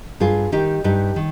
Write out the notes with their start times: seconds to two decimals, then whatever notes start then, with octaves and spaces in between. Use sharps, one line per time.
0.20 G2 F4 G#4
0.52 D#3 D#4 G4
0.84 G2 D#4 G4
1.16 D#3